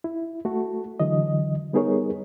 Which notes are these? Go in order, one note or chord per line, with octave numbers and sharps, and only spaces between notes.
E4
A3 F#4 A4
D3 E3 F#3 D#5
G3 B3 D#4 G#4 A#4 C#5